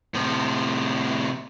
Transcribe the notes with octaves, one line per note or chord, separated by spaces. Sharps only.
A2 C3